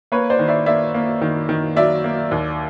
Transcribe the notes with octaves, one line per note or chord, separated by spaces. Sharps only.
A#3 B4 C#5
C5 D5
D#3
D5 E5
A#3 D5 E5
A#3
D#3
D#3
F#3 D5 E5
A#3
D#2